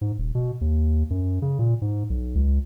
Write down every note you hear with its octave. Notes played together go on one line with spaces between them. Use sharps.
G#2
D#1
B2
D#2
F#2
C#3
A#2
G#2
B1
C#2